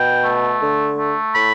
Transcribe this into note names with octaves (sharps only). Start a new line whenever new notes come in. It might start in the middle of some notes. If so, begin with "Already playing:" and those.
Already playing: B2 G5
A3
D3
A3
A2 B5